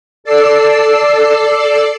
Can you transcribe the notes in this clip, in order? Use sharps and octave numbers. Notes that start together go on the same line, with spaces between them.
A4 D5 E6 C7